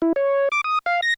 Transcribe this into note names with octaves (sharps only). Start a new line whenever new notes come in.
E4
C#5
D6
D#6
F5
A#6